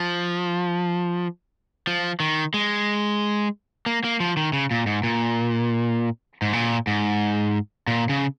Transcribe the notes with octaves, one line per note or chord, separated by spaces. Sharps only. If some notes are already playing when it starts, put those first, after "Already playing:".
Already playing: F3
F3
D#3
G#3
A#3
A#3
F3
D#3
C#3
A#2
G#2
A#2
G#2
A#2
G#2
A#2
C#3